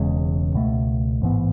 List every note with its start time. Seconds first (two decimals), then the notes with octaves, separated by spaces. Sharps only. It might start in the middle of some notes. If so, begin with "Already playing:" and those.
Already playing: E1 E2 C#3 G#3
0.54 C#2 B2 A3
1.22 A1 G#2 E3 B3